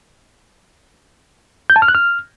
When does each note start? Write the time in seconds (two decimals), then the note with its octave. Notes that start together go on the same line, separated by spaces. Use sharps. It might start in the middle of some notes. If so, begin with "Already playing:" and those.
1.70 G6
1.76 A5
1.82 F6
1.88 F#6
1.95 F6